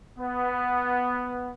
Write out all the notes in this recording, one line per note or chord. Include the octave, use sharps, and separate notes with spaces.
B3